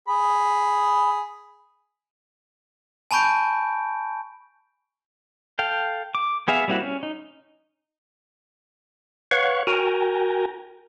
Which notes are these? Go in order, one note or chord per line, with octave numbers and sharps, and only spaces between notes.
G#4 B5
G#5 A5 B5 C#6 G6 D7
A4 F5 G5
D6
B3 G#4 E5 F5
G3 A#3 C4 E4 F#4
C#4
D#4
B4 C#5 F5 F#5 C#6
F#4 A#4 G5 G#5 A#5